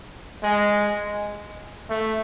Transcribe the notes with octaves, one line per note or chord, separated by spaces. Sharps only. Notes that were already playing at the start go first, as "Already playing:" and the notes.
G#3
A3